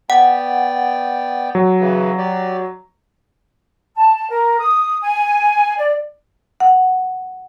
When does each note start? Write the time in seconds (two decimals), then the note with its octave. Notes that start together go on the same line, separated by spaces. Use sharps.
0.10 B3 D5 F#5 G5
1.55 F#3
1.80 C#3 E3
2.18 G4 D5
3.96 A5
4.30 A#4
4.59 D#6
5.02 G#5
5.78 D5
6.60 F#5